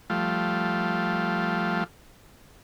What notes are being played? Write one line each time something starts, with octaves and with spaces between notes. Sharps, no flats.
F3 G3 A3 F4